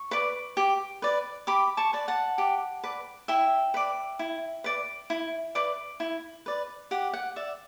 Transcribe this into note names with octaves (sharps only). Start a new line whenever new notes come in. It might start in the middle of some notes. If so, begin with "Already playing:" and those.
Already playing: C#6
B4 D5
G4
B4 D5
G4 B5 D6
A5 C#6
B4 D5
F#5 A5
G4
B4 D5
E4 E5 G5
B4 D5
E4
B4 D5
E4
B4 D5
E4
B4 D5
G4 F#5
F#5
D5 E5